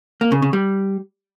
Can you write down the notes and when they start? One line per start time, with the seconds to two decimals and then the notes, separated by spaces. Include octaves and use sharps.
0.21 A#3
0.32 C#3
0.42 C#3
0.53 G3